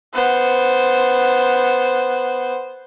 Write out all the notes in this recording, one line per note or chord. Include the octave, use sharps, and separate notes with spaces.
B3 C5